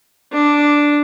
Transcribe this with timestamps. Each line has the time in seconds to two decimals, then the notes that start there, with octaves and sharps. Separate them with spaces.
0.33 D4